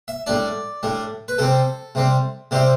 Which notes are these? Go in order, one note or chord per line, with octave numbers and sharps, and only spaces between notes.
E5
A2 G3 D4 D5
A2 G3 D4
B4
C3 G3 C4 A4
C3 G3 C4
C3 G3 C4 E4 G4